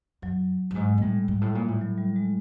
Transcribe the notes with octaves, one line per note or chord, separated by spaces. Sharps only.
F#2 F#3
G2
G#2 G#3
A#2
A2 G3
G#2
A2
A#2
A2
F#3
G3
G#3